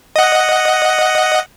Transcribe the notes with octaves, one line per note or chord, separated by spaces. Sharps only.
D#5 F#5